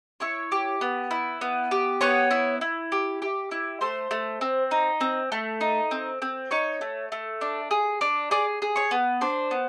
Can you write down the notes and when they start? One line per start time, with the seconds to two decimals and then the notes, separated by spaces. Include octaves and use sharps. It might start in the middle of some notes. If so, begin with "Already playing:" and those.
0.20 E4 C#5 C#6
0.52 G4
0.81 B3
1.11 E4
1.41 B3
1.71 G4
2.01 B3 C#5 C#6
2.31 E4
2.61 E4
2.92 G4
3.22 G4
3.51 E4
3.81 A3 C5 C6
4.11 A3
4.41 C4
4.71 D#4
5.01 C4
5.32 A3
5.61 D#4
5.91 C4
6.22 C4
6.51 D#4 C#5 C#6
6.81 A3
7.12 A3
7.41 D4
7.71 G#4
8.01 D4
8.31 G#4 D5 D6
8.62 G#4
8.76 C#5 C#6
8.91 B3
9.21 D4 C5 C6
9.51 B3